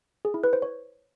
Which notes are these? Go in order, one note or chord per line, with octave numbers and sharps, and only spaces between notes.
G#4
E4
B4
C5
C#5